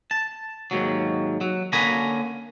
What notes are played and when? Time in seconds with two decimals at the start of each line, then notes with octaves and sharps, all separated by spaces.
0.11 A5
0.71 D#2 G#2 F#3
1.41 F#3
1.73 D3 A#3 C#4 G#5 A#5 B5